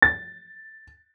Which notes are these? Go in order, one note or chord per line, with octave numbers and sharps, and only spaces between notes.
A6